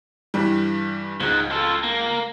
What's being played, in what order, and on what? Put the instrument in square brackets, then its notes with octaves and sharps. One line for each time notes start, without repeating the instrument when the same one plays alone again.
[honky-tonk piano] G2 E3 G3
[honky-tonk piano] C#2 [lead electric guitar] G#2
[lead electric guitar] F4 A4
A#3